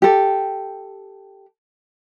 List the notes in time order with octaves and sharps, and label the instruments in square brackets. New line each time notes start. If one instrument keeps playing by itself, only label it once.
[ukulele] G4 A4